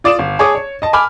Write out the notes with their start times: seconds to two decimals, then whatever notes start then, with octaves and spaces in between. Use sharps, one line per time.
0.04 F4 D5 D6 D#6 E7
0.19 G1
0.39 G#4 C#5 A5 D6 D#6
0.55 C#5
0.82 D#5 A5
0.93 G#5 B5 D6 F6